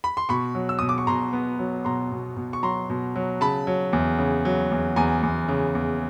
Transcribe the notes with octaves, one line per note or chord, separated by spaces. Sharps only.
B5
C6
B2 B5 C#6
F#3
E6
B2 D#6
D6
C#6
B2 A#5 C6
B3
F#3
B2 A#5 C6
B2
B2
C#6
F#3 A#5 C6
B2
F#3
C#3 A5 B5
F#3
E2
C#3
F#3
E2
E2 G#5 A#5
E2
C#3
E2